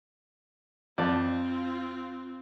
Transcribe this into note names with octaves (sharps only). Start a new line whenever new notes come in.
F2 C4 F4 D5 A5